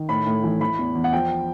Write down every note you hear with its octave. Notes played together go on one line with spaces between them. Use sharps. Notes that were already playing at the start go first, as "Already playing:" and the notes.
Already playing: D#3
A2 B5
A2
E3
E3 B5
E2
E2
F#5
F3 G5